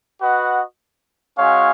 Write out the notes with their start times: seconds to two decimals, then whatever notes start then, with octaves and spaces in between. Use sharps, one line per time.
0.20 F#4 B4 D#5 F#5
1.37 G#3 C#4 F#4 C#5 F5